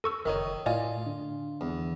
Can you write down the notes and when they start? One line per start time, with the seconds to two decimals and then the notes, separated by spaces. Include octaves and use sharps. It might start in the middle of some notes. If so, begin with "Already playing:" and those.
0.04 A4 C#6 E6
0.26 F#1 D#3 D#4 A#4 C#5
0.66 A2 F4 D5 D#5 G#5
1.06 D3
1.61 E2